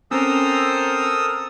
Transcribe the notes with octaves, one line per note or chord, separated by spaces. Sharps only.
C4 C#4 A4 A#4 C5 A#5 D#6 E6